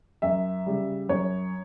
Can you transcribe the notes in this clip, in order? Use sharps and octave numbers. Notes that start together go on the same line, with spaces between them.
F#2 E5
C#3 G3
F#2 C#5